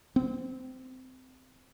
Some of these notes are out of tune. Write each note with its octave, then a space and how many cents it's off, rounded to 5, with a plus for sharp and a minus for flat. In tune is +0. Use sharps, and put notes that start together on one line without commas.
C4 -20